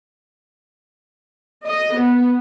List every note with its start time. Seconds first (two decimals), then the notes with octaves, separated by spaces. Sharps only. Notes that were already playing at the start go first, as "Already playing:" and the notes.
1.67 D#5
1.98 B3